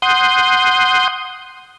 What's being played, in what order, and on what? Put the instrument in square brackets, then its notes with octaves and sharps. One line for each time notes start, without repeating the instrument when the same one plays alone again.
[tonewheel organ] F#5 C6 D#6 G6